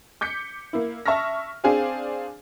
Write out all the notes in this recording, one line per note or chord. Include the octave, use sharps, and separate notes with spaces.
D6 G6 B6 C#7
A#3 E4
E5 A5 C#6 F6 A#6
C4 D4 G#4 C5 F5 G#5